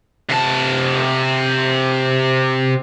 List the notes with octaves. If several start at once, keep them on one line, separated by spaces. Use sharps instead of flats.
C3 A5